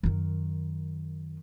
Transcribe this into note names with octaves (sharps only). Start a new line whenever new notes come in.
F#2 D#3